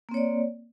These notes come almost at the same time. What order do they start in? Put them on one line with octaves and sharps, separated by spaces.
A#3 C4 C#5 D5